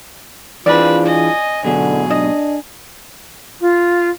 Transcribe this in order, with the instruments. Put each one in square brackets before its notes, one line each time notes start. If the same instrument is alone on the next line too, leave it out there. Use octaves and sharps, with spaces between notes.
[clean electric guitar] E3 D4 G#4 [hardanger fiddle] C4 B4 [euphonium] F4 [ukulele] D5
[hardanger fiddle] D#5 G#5
[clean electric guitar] G#2 B2 F#3 [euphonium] D3 [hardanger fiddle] G#4
[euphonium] D4 [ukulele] D#5
[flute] F4